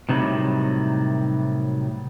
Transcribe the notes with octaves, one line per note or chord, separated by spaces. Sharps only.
A2 C3 D#3 F#3 G3